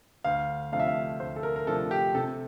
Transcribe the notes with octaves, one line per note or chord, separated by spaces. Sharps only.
D2 F5
C3 F3 A3 D4 F5
E5
F5
D2 C5
A4
A#4
A#4
C3 F3 A3 D4 A4
G4
C3 A4